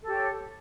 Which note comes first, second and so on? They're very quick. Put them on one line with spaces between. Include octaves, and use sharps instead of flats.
A4 G4 C#5